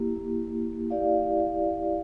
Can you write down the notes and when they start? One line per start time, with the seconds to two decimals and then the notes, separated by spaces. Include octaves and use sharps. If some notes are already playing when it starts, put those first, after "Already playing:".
Already playing: A#3 E4 G4
0.90 E4 G4 D5 F5